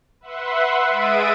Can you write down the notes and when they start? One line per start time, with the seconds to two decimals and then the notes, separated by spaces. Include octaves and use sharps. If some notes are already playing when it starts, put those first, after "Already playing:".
0.21 B4 E5 F#5 C6
0.85 G#3 E5 D#6 A6 D7 D#7